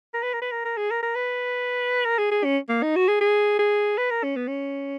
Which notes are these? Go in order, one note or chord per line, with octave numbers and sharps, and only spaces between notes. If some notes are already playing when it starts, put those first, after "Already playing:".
A#4
B4
A#4
B4
A#4
A#4
G#4
A#4
A#4
B4
A#4
G#4
G#4
C#4
A#3
D#4
F#4
G#4
G#4
G#4
B4
A#4
C#4
B3
C#4